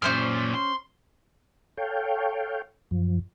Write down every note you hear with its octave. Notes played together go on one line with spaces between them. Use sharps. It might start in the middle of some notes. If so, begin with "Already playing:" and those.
F#2 A#2 C#4 C5 F6
C6
A4 C#5 F5 G5
F#2 F3